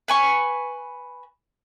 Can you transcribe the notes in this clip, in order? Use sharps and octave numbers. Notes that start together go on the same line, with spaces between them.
B4 G#5 C#6